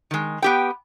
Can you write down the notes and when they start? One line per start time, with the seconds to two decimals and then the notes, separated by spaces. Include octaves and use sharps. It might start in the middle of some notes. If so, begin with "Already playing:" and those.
0.11 D#3 G#3
0.42 B3 G4 G5